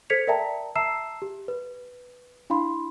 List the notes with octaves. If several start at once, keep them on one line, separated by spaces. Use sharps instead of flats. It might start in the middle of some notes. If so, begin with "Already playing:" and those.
A4 C5 G#6 B6 C#7 F7
A#4 D5 E5 G5 A5 A#5
E5 A5 A#5 E6 C7 E7
G4
B4
D4 E4 F5 B5 C6